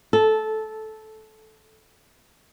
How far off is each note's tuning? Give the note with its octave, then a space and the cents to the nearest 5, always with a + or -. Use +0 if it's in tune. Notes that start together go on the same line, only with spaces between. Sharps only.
A4 -15